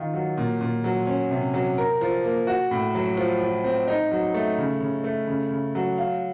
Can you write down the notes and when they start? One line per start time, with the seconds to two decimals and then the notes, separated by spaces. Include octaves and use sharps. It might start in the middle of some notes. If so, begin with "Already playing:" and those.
Already playing: D#3 F4
0.14 F#3
0.37 A#2
0.61 A#2
0.84 F#3
1.07 C#4
1.31 C3
1.54 F#3
1.78 A#4
2.01 F3
2.24 A#3
2.47 F#4
2.71 A2
2.95 F#3
3.17 F3
3.41 F3
3.64 C4
3.88 D#4
4.12 F#3
4.34 A3
4.58 C#3
4.80 C#3
5.04 A3
5.27 C#3
5.51 C#3
5.75 F#3
5.98 F5